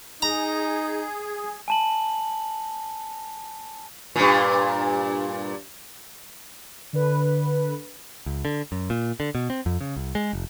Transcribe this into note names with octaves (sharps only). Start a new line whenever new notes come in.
D#4 G#4 A#5
G#5 A5 F#7
G2 A#2
D3 B4
C#2
D3
F#2
A#2
D3
B2
C4
F2
C#3
C2
G#3
F1